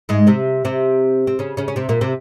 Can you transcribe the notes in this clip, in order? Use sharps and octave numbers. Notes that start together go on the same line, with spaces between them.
G#2 G#3
C3 C4
C3 C4
C4
C#3 C#4
C#3 C#4
C#4
C3 C4
A#2 A#3
C3 C4